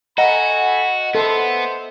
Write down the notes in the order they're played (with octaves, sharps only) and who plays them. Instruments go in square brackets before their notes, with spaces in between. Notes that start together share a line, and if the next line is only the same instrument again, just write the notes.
[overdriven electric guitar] F#4 [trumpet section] A4 G#5 B5 [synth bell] D#5 F#5 [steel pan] A#5
[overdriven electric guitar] B3 [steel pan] A4 [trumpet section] C5 E5 C6